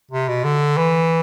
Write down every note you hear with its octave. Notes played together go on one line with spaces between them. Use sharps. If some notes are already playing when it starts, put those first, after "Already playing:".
C3
B2
D3
E3